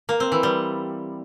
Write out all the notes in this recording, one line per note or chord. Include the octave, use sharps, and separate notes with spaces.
A#3
C4
E3
G3